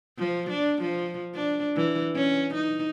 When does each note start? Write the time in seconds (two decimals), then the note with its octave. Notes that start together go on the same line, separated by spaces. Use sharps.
0.18 F3
0.50 D4
0.82 F3
1.35 D4
1.76 E3
2.16 C#4
2.54 D#4